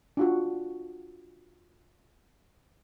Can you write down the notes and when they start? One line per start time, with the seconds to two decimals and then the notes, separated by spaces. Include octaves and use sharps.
0.17 D4 F4 F#4